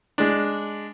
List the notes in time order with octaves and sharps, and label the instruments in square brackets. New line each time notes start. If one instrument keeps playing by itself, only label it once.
[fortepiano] G#3 D4